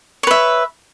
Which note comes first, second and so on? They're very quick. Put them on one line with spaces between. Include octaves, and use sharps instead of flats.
C#5 B4 E5